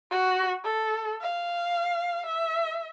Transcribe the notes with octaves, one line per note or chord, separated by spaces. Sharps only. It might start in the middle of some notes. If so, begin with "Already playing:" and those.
F#4
A4
F5
E5